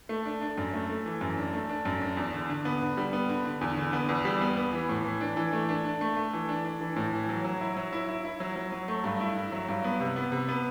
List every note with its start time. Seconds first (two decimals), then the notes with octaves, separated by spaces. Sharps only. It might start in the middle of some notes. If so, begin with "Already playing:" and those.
0.09 A3
0.25 D4
0.42 D4
0.58 F#2
0.74 A3
0.90 A3
1.06 E3
1.21 F#2
1.37 D4
1.53 A3
1.69 D4
1.85 F#2
2.01 D4
2.17 E2
2.33 D3
2.49 D3
2.65 B3
2.81 D3
2.97 G3
3.13 B3
3.29 D3
3.45 D3
3.61 E2
3.77 D3
3.93 B3
4.09 E2
4.25 G3
4.41 B3
4.57 B3
4.73 E3
4.89 A2
5.05 E3
5.21 D4
5.37 E3
5.53 A3
5.69 D4
5.85 D4
6.01 A3
6.17 A3
6.33 E3
6.49 D4
6.65 D4
6.81 E3
6.96 A2
7.13 E3
7.29 F#3
7.45 F#3
7.61 E4
7.77 F#3
7.93 E4
8.09 E4
8.25 E4
8.40 F#3
8.56 F#3
8.72 F#3
8.88 A3
9.04 G2
9.20 E4
9.37 E4
9.52 F#3
9.69 G2
9.84 B3
10.00 C3
10.16 B3
10.32 C3
10.49 B3